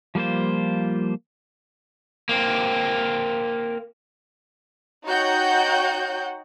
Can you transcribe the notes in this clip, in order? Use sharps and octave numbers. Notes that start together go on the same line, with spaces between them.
F3 G3 A#3 F4 C5
A#3 C4
D#4 F#4 C#5 F#5 G5 G6